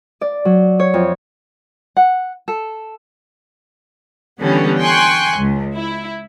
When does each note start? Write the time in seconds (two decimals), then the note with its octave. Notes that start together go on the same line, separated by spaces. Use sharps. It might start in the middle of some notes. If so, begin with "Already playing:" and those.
0.21 D5
0.45 F#3
0.79 C#5
0.94 F2
1.97 F#5
2.48 A4
4.39 D3 E3 G3 B3 C#4
4.81 G5 G#5 C6 C#6 F#6
5.38 C#2
5.74 E4